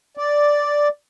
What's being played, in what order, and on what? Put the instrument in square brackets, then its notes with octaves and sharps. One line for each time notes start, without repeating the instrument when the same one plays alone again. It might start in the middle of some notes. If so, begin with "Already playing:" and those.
[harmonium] D5